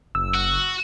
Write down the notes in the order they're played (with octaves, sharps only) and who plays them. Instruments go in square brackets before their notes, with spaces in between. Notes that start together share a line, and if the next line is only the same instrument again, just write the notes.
[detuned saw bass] F#1 [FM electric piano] E6
[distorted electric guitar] F#4